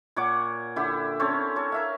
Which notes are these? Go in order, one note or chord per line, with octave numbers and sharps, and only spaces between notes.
A#2 C#5 F#5 D6
D3 E4 G4 F#5
C4 C#4 A4 C#5
A4 C#5
A#4 E5 F5